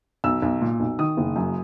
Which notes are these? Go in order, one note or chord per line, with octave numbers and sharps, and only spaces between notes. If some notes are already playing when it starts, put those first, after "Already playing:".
B1 E6
B1
A#2
B1
D#3 D#6
F#1
F#2